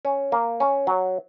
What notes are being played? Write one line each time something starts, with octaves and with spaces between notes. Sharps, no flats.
C#4
A#3
C#4
F#3